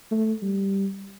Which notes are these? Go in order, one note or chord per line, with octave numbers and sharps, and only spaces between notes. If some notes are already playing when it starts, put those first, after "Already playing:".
A3
G3